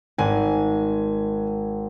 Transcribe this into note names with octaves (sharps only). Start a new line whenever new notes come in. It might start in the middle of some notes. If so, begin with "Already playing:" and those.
G#1 G#5